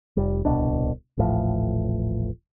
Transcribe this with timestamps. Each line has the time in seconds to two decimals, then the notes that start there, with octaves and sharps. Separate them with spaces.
0.17 F1 G3
0.45 D1 C2 B2 D4
1.17 D#1 A1 A2 F3